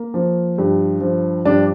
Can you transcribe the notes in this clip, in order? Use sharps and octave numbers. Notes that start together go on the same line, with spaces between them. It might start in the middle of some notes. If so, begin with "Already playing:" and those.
Already playing: A#3
F3
G2
F3
G2 D4